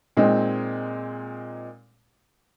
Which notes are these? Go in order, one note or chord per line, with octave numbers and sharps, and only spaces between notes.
A#2 G#3 C4 D#4